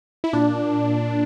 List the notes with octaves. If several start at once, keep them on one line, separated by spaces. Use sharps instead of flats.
E4
A#2 D4
A#2